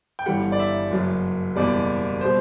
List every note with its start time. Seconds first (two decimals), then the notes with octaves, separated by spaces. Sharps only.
0.19 G5
0.26 G1 G2 E3 G3 F#5
0.52 D5
0.59 E5
0.91 F#1 F#2 F#3
1.56 F#1 E2 B2 G3 D5
2.21 B2 G3 C5